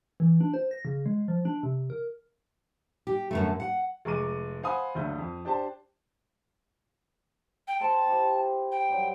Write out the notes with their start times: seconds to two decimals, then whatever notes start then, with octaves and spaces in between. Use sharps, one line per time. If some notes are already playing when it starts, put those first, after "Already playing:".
0.20 E3
0.41 D4
0.54 C5
0.71 A#6
0.85 C#3
1.06 G#3
1.28 F3
1.45 D4
1.63 C3
1.90 A#4
3.07 G4
3.31 F#2 D3 A3
3.60 F#5
4.05 F1 G#3 A#5 C#6 D6 D#7
4.63 C5 F5 F#5 G#5 B5 D#6
4.95 F#1 D2 G2 E5 G6
5.18 F2
5.45 D4 G4 C5 A5
7.68 G5
7.80 C5 F5 G5 A5
8.07 E4 G4 C5
8.72 G5
8.89 G2 F#3